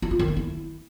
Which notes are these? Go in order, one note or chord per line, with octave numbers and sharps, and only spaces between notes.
E4
F4
D#3
D4
E4